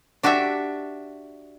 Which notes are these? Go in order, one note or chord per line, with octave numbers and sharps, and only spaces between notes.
D4 F#4 G4 D5 E5